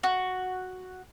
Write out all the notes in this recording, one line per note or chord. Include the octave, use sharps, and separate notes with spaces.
F#4